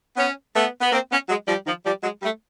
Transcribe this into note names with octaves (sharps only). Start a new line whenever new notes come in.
B3 C#4
A3 B3
B3
A#3 C4
B3 C#4
F#3 G#3
F3 G3
D#3 F3
F3 G3
F#3 G#3
G3 A3